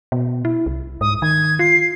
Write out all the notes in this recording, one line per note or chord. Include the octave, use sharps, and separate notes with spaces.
B2
E4
C2
G#2 D#6
D#3 G#6
F4 C7